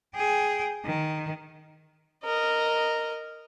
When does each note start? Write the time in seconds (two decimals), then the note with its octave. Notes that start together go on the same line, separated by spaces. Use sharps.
0.15 G#4 G5
0.85 D#3
2.24 A#4 D#5